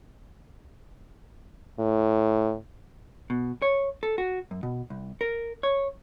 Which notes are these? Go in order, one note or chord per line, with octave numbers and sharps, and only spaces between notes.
A2
B2
C#5
A4
F#4
F#2
B2
C2
A#4
C#5